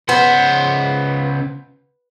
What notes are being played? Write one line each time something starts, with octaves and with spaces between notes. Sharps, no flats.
C#2 B3 C5